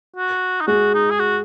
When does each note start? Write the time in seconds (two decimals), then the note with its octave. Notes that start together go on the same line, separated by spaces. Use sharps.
0.17 F#4
0.61 D#4
0.67 G#3 F#4 G#4
0.94 D#4
1.11 G#4
1.19 F#4